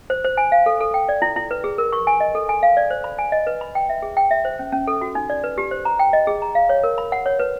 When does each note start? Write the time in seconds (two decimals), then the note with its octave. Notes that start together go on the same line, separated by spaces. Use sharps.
0.10 C5
0.24 C5
0.37 G#5
0.52 F5
0.66 A4
0.81 A4
0.94 G5
1.09 D5
1.22 E4
1.36 E4
1.51 B4
1.64 G#4
1.78 A#4
1.93 C#6
2.07 G#5
2.20 D#5
2.35 A4
2.49 G#5
2.63 F5
2.77 D5
2.90 C5
3.04 B5
3.19 G#5
3.32 D#5
3.47 B4
3.61 B5
3.75 G5
3.89 E5
4.02 G#4
4.17 G5
4.31 E5
4.45 C5
4.59 C#4
4.72 C#4
4.87 A4
5.01 F#4
5.15 D#4
5.30 D5
5.44 B4
5.58 G4
5.71 C5
5.85 A#5
5.99 G5
6.13 D#5
6.27 G#4
6.42 A#5
6.55 F5
6.69 C#5
6.84 A#4
6.98 B5
7.12 F#5
7.26 C#5
7.39 B4